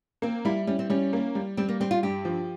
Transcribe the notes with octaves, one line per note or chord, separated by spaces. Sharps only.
A#3 C4
G3 E4
G3 C#4
C4
G3 C#4
A#3
G3
G3 C4
A#3
G3 C4
F4
G2 G4
F3